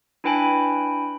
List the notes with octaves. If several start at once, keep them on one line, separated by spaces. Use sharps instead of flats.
D4 E4 B4 G5 G#5 B5